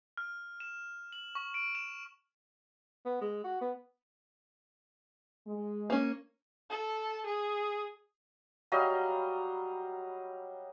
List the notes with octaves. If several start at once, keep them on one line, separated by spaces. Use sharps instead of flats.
F6
E7
F#7
C#6
D7
E7
B3
G#3
F#4
B3
G#3
A#3 C#4
A4
G#4
F#3 G3 D#5 F5